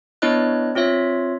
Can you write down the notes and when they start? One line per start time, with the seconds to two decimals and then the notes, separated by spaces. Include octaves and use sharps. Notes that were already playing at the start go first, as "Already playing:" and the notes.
0.22 B3 D4 E4 C#5 D#5 F#6
0.75 C4 F4 C#5 E5